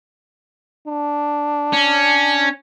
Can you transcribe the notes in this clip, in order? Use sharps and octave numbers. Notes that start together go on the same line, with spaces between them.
D4
C#4